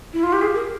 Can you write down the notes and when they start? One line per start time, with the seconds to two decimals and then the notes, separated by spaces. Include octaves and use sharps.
0.14 E4
0.23 F4
0.33 G4
0.42 G#4
0.55 A#4